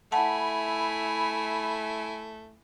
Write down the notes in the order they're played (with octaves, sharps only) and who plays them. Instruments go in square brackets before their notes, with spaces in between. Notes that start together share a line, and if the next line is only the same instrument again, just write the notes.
[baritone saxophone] A3 [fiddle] E4 G#5 [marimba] F#5 A5 [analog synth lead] B5